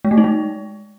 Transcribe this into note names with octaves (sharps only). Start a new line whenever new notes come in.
G#3
A3
D#4
G#3